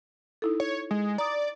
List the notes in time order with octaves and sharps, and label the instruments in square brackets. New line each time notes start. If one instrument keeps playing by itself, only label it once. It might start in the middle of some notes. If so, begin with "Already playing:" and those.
[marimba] D#4 E4 A4
[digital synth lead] C#5
G#3
[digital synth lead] D5 [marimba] A#5 D#6